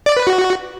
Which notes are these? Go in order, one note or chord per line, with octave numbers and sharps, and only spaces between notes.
D5
B4
F#4